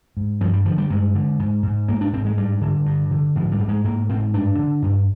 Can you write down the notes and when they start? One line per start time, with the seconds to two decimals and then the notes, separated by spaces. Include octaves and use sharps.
0.17 G#2
0.41 G2 F3
0.53 G3
0.65 D3 F3
0.78 G3
0.90 G2 G#3
1.15 D3
1.39 G#2
1.63 G#2
1.88 G#2 A#3
2.01 D4
2.13 G#2 C4
2.25 G#3
2.37 G2 G3
2.61 D3
2.86 G2
3.11 D3
3.35 G#2 F3
3.52 G3
3.59 G#2
3.68 G#3
3.84 G#2 A#3
4.09 G#2 C4
4.34 G2 D4
4.59 D3
4.82 G2